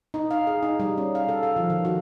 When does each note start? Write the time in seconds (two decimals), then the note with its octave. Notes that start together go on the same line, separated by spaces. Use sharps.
0.14 D#4
0.31 F5
0.47 G#4
0.63 D#4
0.80 G3
0.98 C#4
1.15 F5
1.28 A4
1.43 F5
1.56 F3
1.70 D#3
1.85 F#4